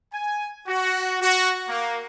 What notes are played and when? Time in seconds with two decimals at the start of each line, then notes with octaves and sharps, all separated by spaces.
0.13 G#5
0.67 F#4
1.22 F#4
1.69 A#3